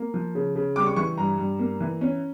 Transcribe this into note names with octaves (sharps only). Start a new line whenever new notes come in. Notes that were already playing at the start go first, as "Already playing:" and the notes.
Already playing: A#3
F3
C#3
C#3
G3 D6
C#6
E3 C#6
G2 A#5
G2
A#3
E3
C#4